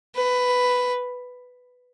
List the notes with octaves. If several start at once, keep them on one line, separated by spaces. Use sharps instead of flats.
B4